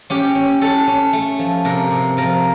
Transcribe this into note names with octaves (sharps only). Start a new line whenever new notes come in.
C#4 G4
C#4
C#4 A4
C#4
A3
F3
C3 A#4
C3
F3 A#4